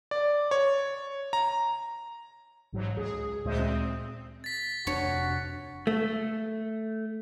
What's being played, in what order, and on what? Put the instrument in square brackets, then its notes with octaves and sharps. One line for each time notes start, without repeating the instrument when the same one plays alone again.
[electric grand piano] D5
C#5
A#5
[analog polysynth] A1 G#2 F#3
C#2 G#4
D2 A#2 G#3 C5 E5 D#6
C4
[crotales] A6 B6
[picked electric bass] F1 C3 D4 [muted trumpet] F#4 [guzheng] C#5
[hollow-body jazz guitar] A3